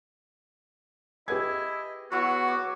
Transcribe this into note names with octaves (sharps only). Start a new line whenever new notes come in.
E4 G4 G#4 B4 D#5 G#6
F#3 B3 E4 F#4
D6